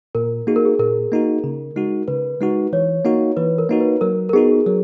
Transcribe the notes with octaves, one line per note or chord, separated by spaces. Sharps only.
A#2 A#4
A#3 D#4 F#4 G#4
A#4
G#4
A#2 A#4
A#3 D#4 F#4
C#3
G#3 D#4 F#4
C#3 B4
G#3 D#4 F#4
E3 C#5
A#3 D#4 F#4
E3 B4
A#4
A#3 D#4 F#4
B4
F#3 A#4
A#4
B3 D#4 F#4 G#4
F#3 A#4